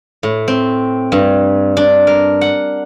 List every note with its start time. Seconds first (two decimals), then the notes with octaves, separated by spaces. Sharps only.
0.23 A2
0.48 C4
1.12 G2
1.77 D4
2.07 A#4
2.41 F#5